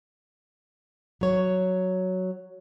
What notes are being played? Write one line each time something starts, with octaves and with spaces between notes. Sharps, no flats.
F#3 C#5